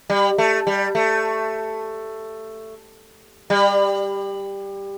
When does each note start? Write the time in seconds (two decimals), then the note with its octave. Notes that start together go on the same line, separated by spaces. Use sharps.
0.10 G3
0.38 A3
0.67 G3
0.95 A3
3.50 G3